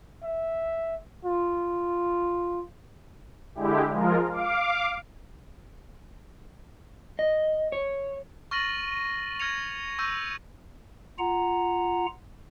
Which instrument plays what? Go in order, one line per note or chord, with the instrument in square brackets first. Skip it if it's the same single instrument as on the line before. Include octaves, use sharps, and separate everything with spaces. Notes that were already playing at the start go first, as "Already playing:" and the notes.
[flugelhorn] E5
F4
[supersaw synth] D3 G#3 E4 G4
F3 G#3 F4 A#4
F5 D6
[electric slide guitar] D#5
C#5
[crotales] C#6 F6 A6 A#6 D#7 F#7
F6 G#6 A#6 C#7 F7
C#6 E6 G6 D#7
[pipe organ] F4 F#5 A#5